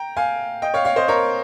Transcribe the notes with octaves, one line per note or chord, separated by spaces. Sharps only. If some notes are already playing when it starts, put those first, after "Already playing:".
Already playing: G5 A#5
F5 G#5
D#5 G5
C#5 F5
C#5 F5
C5 D#5
A#4 C#5